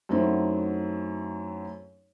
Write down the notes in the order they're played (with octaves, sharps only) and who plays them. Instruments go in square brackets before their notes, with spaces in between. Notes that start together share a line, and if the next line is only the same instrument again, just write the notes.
[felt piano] F#2 F#3 A3 C4 D#4 E4